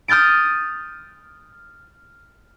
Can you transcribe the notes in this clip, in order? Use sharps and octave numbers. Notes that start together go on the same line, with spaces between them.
D#6 F6 G6 A6 D7